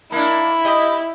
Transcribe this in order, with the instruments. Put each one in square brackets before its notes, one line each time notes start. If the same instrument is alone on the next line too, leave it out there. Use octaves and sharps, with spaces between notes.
[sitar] A#3 D4 [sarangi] E4
[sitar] G4 D#5